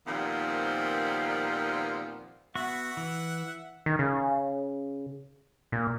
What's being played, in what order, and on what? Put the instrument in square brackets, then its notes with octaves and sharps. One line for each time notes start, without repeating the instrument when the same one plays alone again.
[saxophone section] A#2 D#3 F3 G3 B3 C4
[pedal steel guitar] B3 F#4 C#6 [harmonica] E5 F#5
[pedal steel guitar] E3
[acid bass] D#3
C#3
A#2